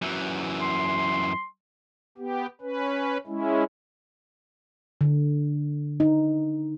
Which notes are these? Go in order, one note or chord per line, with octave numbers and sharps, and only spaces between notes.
F#2 E3
C6
B3 G4
C#4 B4
G#3 C#4 E4
D3
D#4